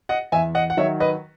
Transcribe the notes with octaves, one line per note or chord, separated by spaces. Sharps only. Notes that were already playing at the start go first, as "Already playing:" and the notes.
D#5 F#5
E2 E5 G#5
D#5 F#5
F#5
D#3 F#3 C#5 E5
B4 D#5